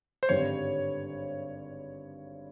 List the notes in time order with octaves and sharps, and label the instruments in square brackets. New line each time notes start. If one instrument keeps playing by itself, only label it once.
[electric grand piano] C5
[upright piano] G#1 G2 D3 G3 [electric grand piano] C#5